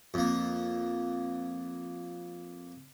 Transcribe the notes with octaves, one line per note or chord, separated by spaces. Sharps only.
F2 A#3